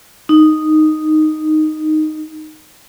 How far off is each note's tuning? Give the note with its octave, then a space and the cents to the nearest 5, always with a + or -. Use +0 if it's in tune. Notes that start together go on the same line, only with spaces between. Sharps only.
D#4 -5